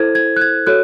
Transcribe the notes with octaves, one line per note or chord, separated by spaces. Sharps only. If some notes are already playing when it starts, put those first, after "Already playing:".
Already playing: E4 A4 C5 G#6
G#6
F#6
G#6
F#4 A4 C#5 F#6